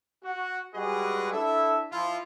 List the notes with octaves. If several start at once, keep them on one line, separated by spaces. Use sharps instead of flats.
F#4
G3 G#3 F#4 G#4 B4 D#5
D4 E4 A4 E5
F3 E4 F4